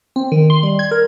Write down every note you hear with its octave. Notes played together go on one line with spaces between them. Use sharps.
C4
D#3
C6
G3
G#6
A#4